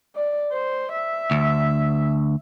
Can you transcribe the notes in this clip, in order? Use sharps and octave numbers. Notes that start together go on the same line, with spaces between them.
D5
C5
E5
D2